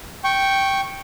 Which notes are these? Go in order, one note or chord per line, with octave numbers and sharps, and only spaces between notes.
G5 C#6